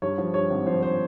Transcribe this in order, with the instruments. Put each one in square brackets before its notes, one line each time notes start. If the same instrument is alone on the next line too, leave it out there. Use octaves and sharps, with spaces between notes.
[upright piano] G2 C#5
F3
G2 C#5
G#1
F3 C5
C5